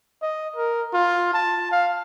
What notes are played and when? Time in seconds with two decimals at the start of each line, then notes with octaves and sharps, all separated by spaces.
0.22 D#5
0.56 A#4
0.93 F4
1.33 A5
1.71 F5